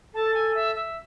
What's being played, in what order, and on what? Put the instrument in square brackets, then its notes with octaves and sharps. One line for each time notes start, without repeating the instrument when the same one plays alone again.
[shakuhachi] A4 [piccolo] A5
[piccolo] G#5
E5
E5